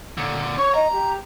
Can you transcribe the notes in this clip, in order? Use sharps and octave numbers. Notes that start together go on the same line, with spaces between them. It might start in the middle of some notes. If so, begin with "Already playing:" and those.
A#2 D3
C#5 C#6
D#5 A#5
G4